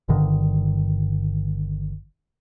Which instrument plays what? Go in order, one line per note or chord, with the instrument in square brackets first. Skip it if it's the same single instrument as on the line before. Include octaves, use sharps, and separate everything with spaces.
[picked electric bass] G1 G2 D3 D#3